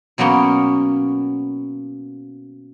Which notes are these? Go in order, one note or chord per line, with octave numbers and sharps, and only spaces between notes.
B2 F#3 A#3 B3 C#4